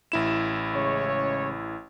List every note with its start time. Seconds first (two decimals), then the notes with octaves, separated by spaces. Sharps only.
0.12 A1 E4 E7
0.74 C#3 G#3 C#5